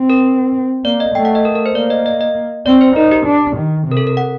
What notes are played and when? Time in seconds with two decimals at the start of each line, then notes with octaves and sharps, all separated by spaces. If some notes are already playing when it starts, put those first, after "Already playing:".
Already playing: C4
0.10 A#4
0.85 A#3 D5
1.00 D#5
1.15 A3 G5
1.25 F#5
1.35 D#5
1.45 A#4
1.55 A#4
1.66 C5
1.75 A#3 D5
1.90 D#5
2.06 D#5
2.21 D#5
2.66 C4 D5
2.81 C5
2.96 D#4 A#4
3.11 G4
3.26 D4
3.57 D#3
3.87 C3 A#4
3.97 A4
4.07 A#4
4.17 F#5